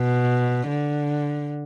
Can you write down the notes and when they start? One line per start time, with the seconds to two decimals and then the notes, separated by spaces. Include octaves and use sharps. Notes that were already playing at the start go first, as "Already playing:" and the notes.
Already playing: B2
0.67 D3